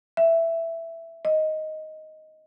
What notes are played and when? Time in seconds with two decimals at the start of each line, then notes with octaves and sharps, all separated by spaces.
0.17 E5
1.25 D#5